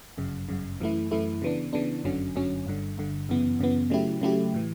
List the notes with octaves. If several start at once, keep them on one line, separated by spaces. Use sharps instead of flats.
G1 F#2 C#3
G1 F#2 C#3
F#2 E3 A3 E4
F#2 E3 A3 E4
C#3 E3 B3 D4
C#3 E3 B3 D4
G1 F#2 D3 F#3 C#4
G1 F#2 D3 F#3 C#4
G1 G2 D3
G1 G2 D3
F#2 C#3 E3 B3
F#2 C#3 E3 B3
C#3 F#3 A3 E4 G4
C#3 F#3 A3 E4 G4
A2 E3